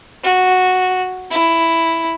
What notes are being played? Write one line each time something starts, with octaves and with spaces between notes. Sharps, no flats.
F#4
E4